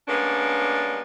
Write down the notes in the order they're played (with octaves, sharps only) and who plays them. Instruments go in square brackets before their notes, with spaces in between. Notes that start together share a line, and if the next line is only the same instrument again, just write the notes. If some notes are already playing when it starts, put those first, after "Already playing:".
[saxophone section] G3 G#3 A#3 B3 C#4 D4